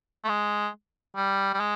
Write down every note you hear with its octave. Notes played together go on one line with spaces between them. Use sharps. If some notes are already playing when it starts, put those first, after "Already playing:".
A3
G#3
G3
G3
G#3